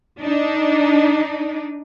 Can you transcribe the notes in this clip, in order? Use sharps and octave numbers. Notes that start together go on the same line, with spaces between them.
D4 D#4